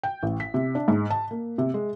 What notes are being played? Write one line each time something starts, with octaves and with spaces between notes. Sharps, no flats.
G5
A1
B6
C3
D4
G#2
A5
A#3
C3
G#3